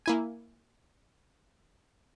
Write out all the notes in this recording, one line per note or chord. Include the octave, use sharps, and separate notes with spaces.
A#3 E4 G#5